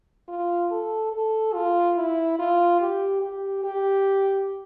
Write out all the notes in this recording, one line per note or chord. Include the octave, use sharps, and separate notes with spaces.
F4
A4
A4
F4
E4
F4
G4
G4
G4